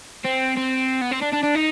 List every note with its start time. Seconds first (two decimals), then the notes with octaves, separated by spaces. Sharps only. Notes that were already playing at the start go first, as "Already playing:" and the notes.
0.24 C4
0.57 C4
1.01 B3
1.12 C4
1.22 D4
1.33 D4
1.44 D4
1.55 D#4